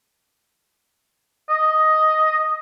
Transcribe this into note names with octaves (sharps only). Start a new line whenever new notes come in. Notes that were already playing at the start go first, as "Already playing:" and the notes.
D#5